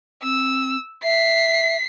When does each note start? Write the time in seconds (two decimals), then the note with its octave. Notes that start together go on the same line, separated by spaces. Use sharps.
0.23 C4 E6
1.03 E5 B6 C7